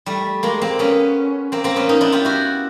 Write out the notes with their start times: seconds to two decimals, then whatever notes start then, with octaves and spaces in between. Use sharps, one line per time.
0.06 G3 A3
0.43 G#3 A#3
0.61 A#3 C4
0.79 B3 C#4
1.52 A#3 C4
1.64 A#3 C4
1.76 B3 C#4
1.89 C#4 D#4
2.01 D4 E4
2.12 F4 G4
2.25 E4 F#4